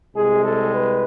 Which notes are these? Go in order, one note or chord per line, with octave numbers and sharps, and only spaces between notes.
C2 C3 G#3 G#4
A4
B4